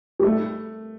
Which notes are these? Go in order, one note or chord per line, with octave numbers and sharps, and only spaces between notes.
G3
A3